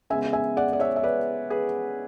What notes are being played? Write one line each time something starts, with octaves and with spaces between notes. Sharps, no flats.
C#3 G#3 B3 E5 G#5
E5 G#5
D5 F#5
D5
C#5 E5
E5
B4 D5
G#4 B4